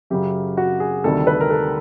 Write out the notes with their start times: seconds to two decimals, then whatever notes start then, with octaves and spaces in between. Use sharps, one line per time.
0.10 F#2 C#3 F#3 G4
0.57 F#4
0.80 G#4
1.04 D2 C3 D#3 G3 A4
1.27 B4
1.40 A#4
1.51 A4